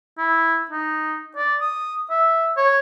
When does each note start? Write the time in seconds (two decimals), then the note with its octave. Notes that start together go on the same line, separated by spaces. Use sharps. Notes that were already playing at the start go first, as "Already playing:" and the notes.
0.18 E4
0.71 D#4
1.37 D5
1.61 D#6
2.10 E5
2.57 C#5